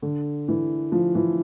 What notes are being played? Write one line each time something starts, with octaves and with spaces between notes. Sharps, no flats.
D3
E3
F3
E3